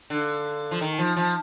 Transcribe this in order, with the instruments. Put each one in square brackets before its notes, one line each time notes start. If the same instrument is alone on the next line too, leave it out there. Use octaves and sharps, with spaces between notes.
[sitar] D3 [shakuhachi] F5
[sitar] F3
[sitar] D#3 [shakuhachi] A#5
[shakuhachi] G5
[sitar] F3 [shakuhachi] A5
[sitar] F3 [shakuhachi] A5